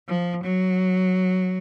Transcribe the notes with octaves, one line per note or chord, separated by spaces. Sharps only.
F3
F#3